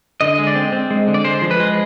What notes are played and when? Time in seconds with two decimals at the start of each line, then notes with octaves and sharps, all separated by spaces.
0.21 D3 D#5
0.38 G#3
0.47 D5
0.55 C4
0.73 C4
0.91 G#3
1.08 D3
1.14 D5
1.24 G#3 C5
1.42 F3
1.51 B4
1.60 G#3